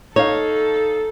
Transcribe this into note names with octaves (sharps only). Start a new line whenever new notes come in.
D#4 A4 C#5 F5